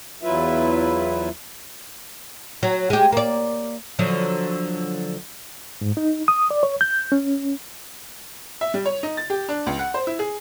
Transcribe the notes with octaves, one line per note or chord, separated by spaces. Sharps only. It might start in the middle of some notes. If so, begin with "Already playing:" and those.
E2 F#3 E4 F4 B4 E5
F#3
G#3 G4
A#3 D5
D3 F3 F#3
G#2
D#4
D#6
D5
C#5
G6
C#4
E5
G3
C#5
D#4
A6
G4
D4
C#2
F#5
C5
E4
G#4